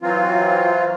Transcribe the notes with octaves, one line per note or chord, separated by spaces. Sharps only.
E3 F#3 C4 F4